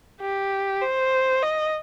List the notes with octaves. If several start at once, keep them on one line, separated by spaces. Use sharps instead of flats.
G4
C5
D#5